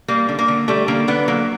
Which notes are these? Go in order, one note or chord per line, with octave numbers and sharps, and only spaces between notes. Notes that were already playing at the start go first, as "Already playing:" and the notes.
G3 A#3
D3
A#3
D3
G3 A3
D3 A#3
D3 B3
F#3 A#3